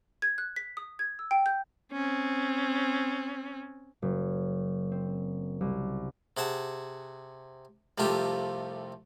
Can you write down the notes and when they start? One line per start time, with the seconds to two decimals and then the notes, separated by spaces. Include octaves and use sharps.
0.22 G#6
0.38 F#6
0.56 B6
0.77 D#6
0.99 G#6
1.19 E6
1.31 G5
1.46 G6
1.92 C4 C#4
4.02 F#1
4.92 C4
5.61 C2
6.37 C3 G#4 F#5 A5
7.98 C2 F2 C3 A3 F4 G4